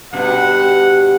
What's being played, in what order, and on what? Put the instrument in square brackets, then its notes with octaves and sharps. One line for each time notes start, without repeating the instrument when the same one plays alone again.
[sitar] G2 B2 [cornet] F#5